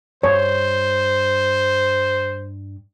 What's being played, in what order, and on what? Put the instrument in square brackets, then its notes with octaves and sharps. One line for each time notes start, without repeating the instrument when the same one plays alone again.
[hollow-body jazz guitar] G2 [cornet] C5 [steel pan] C#5